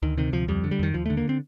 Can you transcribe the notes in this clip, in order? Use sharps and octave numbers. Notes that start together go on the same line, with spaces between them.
D2 D#3
C3 D#3
D2 F3
F2 G3
D3
G3
F2 D#3
D#2 F3
A3
D3
A#3
C4